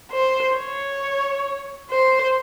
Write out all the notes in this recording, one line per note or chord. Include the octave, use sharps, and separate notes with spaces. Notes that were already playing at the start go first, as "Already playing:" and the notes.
C5
C#5
C5